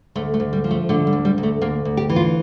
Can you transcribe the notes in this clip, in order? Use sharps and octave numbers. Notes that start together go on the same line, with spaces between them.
D2 A3
A3
D2
G3
F3
A3
D3 A3
G3
D2
G3
D2
A3
D2 A#3
D2
G4
E3
F4